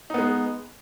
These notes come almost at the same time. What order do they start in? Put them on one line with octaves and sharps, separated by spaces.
D#4 B3 G#3